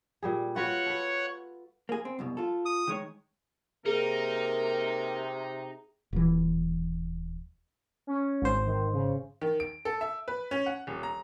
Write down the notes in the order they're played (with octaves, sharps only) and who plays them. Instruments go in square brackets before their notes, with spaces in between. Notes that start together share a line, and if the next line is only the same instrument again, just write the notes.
[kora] A#2 G3 G#4
[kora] F4 F#4 B4 [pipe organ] C#5 F#5
[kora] A4 B4
[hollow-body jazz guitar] A#3 G#4
C4
C2 F#2 B2
F4 A4
[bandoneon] D#6
[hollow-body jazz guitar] D#3 G#3 C#5
[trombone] C3 [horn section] A#3 A#4 [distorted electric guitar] D#4 [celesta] G#4
[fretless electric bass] D#1 E3
[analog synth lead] C#4
[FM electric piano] G#1 C5
[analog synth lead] D#3
C#3
[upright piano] D#3
D7
A4
E5
B4
C#4
F#5
D#1
A#5